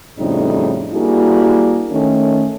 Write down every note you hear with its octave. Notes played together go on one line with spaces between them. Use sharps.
F2 A2 C#3 G3 D4 D#4
G3 A#3 D4 E4 F#4 G#4
D#3 A3 C#4